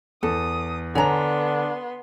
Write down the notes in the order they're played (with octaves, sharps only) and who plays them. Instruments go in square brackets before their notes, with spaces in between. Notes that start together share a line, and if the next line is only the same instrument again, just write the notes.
[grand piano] E2 [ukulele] A4 [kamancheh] D#6
[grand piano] D3 F7 [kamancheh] B3 C6 [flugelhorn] D4 [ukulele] C#5 G#5 A#5